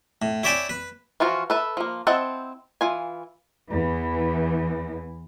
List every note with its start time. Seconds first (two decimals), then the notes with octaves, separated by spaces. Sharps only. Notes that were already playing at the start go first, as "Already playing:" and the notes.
0.22 A2
0.43 E4 C#5 D5 E5 G5 G#5
0.69 B4
1.20 E3 F3 F4 F#4
1.50 A4 B4 E5
1.77 F3 A#3
2.07 C4 E4 D#5 F#5 A5
2.81 E3 F4 G#5
3.69 E2 E3